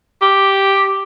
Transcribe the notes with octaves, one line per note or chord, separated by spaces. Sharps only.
G4